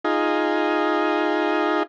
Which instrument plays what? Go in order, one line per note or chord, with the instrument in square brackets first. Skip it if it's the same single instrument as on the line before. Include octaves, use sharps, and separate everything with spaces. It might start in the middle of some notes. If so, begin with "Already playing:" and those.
[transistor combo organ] D#4 F4 G#4